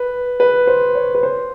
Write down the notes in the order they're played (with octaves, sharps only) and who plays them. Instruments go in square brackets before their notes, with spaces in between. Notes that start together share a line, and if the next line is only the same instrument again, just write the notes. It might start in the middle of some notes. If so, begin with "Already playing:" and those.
Already playing: [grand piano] B4
B4
C5
C#5
B4
C5